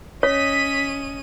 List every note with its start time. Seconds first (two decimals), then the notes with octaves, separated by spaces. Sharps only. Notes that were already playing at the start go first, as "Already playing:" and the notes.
0.23 C#4 C#5 D#5 B6 D#7